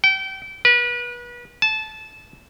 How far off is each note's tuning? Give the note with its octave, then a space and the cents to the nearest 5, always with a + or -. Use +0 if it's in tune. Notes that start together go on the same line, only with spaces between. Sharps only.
G5 -30
B4 -35
A5 -20